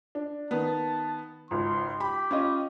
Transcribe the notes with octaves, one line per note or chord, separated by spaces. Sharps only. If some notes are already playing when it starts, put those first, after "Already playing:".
D4
D#3 B3 A5
G#1 C#2 C6
G4 B5
C#4 F4 D#5